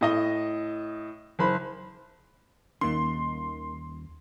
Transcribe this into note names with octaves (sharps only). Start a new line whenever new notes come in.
A2 D#5 G7
F#1 C5 B5
D#2 D#3 G3 A#3 C#4 D#4 C6